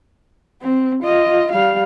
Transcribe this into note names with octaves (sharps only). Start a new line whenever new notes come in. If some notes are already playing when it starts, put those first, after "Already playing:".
C4
F4 D#5
G3 F5